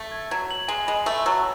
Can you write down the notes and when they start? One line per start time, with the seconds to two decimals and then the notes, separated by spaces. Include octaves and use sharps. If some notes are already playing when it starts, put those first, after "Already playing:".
Already playing: A3
0.12 G#6
0.31 F#3 G#6
0.51 F#7
0.68 G#3 G#5
0.87 G#3 B5
1.06 A3 E6
1.26 F#3 E6